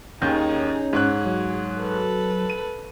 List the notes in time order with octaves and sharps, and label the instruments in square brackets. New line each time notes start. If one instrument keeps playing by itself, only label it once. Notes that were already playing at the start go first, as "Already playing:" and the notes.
[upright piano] D#2 D#3 G6 [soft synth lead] C#4 [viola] D#4 G#4
[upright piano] G#2 C#5 F#6 [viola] G#4
[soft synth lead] F#3
[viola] A4 B4
[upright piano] D#7